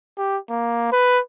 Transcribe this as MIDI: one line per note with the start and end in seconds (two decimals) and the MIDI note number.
0.18 0.37 67
0.50 0.87 58
0.92 1.19 71